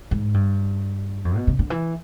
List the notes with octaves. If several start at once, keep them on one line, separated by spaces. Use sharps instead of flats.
G#2
G2
F2
B2
C#3
D3
E3